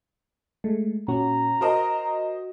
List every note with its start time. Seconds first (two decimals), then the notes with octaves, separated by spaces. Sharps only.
0.64 G#3 A3
1.08 A#2 C#4 F#4 A#5
1.61 F#4 A#4 C5 D#5